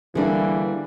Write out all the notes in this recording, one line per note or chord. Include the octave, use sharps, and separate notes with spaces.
D3 E3 G3 A#3 D4 G#4